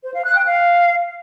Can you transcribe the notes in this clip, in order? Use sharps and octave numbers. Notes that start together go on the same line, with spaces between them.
C5
F5
F#6
G5
F5